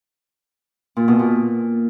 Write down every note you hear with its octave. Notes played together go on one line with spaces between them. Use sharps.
A#2
B2
A#2